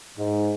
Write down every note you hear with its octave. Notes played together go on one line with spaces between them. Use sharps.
G#2